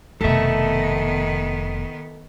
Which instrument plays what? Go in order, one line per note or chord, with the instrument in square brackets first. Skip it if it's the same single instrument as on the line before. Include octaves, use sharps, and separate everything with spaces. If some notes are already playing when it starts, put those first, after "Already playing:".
[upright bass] F1 B2 [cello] D#3 B3 [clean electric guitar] A4 E5